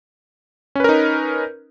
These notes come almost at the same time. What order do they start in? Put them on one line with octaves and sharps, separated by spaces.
C#4 B4 A#4 D#4